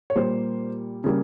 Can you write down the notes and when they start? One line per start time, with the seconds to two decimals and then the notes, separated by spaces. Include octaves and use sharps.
0.10 C#5
0.15 A#2 G3 A#3 C5
1.04 C#3 G3 A#3